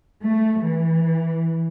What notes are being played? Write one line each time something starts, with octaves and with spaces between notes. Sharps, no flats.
A3
E3